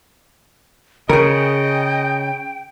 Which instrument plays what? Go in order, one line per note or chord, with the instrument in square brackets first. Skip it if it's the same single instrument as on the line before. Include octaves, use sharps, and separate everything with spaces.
[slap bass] C#3 [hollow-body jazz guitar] G#4 A#4 [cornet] D#5 [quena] G5